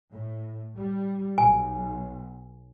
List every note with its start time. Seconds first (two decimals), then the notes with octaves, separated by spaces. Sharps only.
0.12 A2
0.78 G3
1.38 B1 G#5